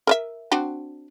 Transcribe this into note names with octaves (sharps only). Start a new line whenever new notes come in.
A#4 D5 E5
C4 D4 F#4